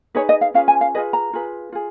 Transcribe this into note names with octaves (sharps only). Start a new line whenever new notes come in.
D#4 G#4 B4 C#5
D#5
F5
C#4 F4 G#4 B4 F5
G#5
F5
F4 G#4 B4 D#5
A#5
F4 G#4 B4
F4 G#4